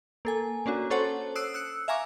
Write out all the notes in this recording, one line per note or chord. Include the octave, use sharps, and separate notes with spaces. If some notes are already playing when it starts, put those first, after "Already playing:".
A#3 A4 G#5
A#3 C#4 D4 F#4
C#4 A4 C5 C#5 F#5 A5
D#6 E6 F#6 C7 D7
E6 F#6 C#7
E5 F5 G#5 A#5 C#6 D6